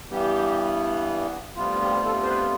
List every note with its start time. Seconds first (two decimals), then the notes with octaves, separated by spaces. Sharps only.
0.11 G2 E3 G3 B3 G4
1.56 D2 C3 G3 B3 F4
1.81 G4
2.05 A4
2.23 C5
2.29 B4